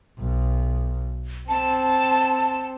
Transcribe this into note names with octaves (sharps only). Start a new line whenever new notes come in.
B1
C4 A5